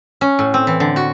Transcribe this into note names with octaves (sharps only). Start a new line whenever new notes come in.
C#4
A2
C4
E3
D3
F#4